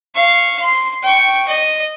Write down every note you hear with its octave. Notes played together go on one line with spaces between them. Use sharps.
F5 C#6
C6
G5 C#6
D#5